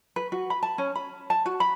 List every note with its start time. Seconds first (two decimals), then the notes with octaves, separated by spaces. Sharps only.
0.16 B4
0.32 F#4
0.50 B5
0.63 A5
0.78 C#4
0.95 B5
1.30 A5
1.46 F#4
1.60 B5